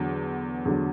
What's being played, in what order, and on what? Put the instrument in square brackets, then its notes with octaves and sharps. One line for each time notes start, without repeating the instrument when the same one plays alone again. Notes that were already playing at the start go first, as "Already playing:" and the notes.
Already playing: [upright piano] E2 D3 F#3
E2 D3 F#3